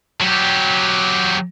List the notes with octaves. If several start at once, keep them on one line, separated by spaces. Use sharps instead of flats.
F#3 G4